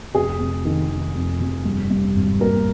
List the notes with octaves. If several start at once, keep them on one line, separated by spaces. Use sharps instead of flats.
F1 G#4
F1
D#3
D#3
F2
F1
G2
G2
G#1
A#3 A#4